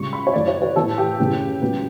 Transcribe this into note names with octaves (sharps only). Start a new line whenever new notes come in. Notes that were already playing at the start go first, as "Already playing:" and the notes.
Already playing: C#2 C#3 G3 C#6
B5
C#5
F#2 E3 A3 D5
C#5
B4
A2 E3 B3 A4
G4
F#2 C#3 E3 G3 B3
C#2 C#3 F#3 B3